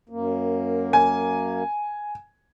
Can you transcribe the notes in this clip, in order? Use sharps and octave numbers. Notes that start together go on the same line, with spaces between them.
F#2 A#3
G#5